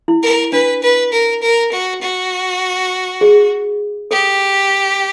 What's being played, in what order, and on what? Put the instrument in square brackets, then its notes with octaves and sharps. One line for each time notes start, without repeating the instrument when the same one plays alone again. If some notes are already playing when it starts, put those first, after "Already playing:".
[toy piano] E4
[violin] A#4
[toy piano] D4 [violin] B4
[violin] B4
A#4
A#4
F#4
F#4
[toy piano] G#4
[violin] G4 [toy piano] A4